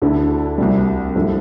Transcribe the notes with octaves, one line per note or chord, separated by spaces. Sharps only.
D2 D3 A3 E4
C2 C3 G3
G2 F3 A3 E4